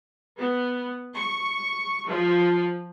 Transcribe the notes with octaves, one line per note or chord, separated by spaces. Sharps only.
B3
C#6
F3